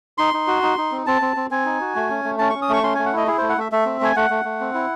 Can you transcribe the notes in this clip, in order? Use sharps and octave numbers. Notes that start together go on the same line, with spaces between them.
D#4 C6
D#4
F#4
D#4
D#4
C4
C4 A5
C4
C4
C4 G#5
D#4
F#4
A3
C#4
A3
C#4 A5
C#4 C#6
D#6
A3 C#6
C#4 C6
A3 G#5
F#5
E4 D#5
E4 G#4
A3 C5
F#5
A3 E5
A3 E5
C4
A3 G#5
A3 F#5
A3
A3
C4
E4